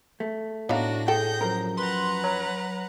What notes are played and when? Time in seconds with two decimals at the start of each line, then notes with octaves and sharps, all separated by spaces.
0.20 A3
0.69 A2 B3 D4 D#4 F#4 F5 A#6
1.08 G#4 A4 G5 G6 A#6
1.41 F#2 F3 A#4
1.78 B4 F#5 A#5 C6
2.24 F#3